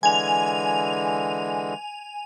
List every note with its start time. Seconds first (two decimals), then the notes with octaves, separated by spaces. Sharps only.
0.03 D3 E3 G#3 G#5 F7